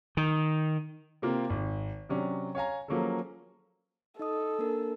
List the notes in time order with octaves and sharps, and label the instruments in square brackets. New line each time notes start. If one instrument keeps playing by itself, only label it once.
[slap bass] D#3
[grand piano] C3 A#3 C4 F4
G#1
C3 F#3 C#4 D4
C#5 F5 G#5 A#5
F3 F#3 A#3 C#4 G#4 A4
[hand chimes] D#4 D#5 D#6 [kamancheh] A4
[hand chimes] A#3 D4 A#4